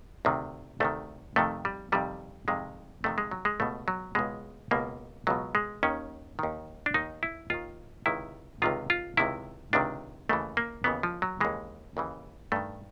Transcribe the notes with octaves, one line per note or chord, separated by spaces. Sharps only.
D2 C3 D#3
D2 C3 D#3 A3
F2 C3 D#3 A3
G3
F2 C3 D#3 G3
F2 C3 D#3 G#3
F2 C3 D#3 A3
G#3
F#3
G#3
C#2 B2 A3
F#3
C#2 B2 G#3
C#2 B2 A#3
C#2 B2 F#3
G#3
D#2 D#3 C#4
D#2 D#3
D4
D#2 D#3 D#4
E4
D#2 D#3 F4
C#2 C3 D#3 E4
C#2 C3 D#3 F4
F4
C#2 C3 D#3 E4
C#2 C3 D#3 D4
D#2 C#3 E3 A3
A#3
D#2 C#3 E3 B3
F3
F#3
D#2 C#3 E3 G#3
D#2 C#3 E3
G2 D#3 A3